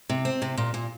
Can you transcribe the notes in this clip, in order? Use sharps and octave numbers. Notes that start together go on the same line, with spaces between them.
C3
C4
C3
A#2
A#2